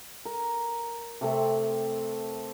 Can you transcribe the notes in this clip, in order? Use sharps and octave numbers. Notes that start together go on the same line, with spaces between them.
A#4
C3 A3 C4